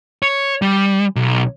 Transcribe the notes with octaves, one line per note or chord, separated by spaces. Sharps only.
C#5
G3
B1